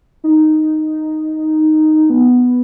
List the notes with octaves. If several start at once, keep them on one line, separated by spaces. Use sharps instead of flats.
D#4
B3